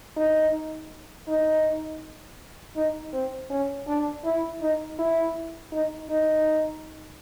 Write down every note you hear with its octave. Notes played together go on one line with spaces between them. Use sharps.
D#4
D#4
D#4
C4
C#4
D4
E4
D#4
E4
D#4
D#4